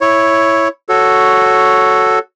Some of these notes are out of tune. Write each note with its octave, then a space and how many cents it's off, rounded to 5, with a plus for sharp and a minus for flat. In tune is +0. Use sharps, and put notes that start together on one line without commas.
E4 +0 C#5 +0
F#4 +0 A4 +0 C#5 +0